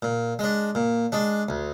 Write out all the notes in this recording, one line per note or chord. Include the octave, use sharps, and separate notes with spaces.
A#2
G#3 D4
A#2
G#3 D4
D2